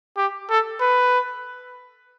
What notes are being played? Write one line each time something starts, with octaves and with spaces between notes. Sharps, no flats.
G4
A4
B4